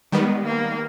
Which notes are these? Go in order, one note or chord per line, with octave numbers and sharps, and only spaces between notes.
D#3 G3 G#3 B3
A#3